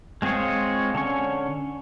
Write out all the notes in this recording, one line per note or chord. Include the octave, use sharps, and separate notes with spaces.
G#3 C4 F4 G#4 C#5
D3 C#4 C#6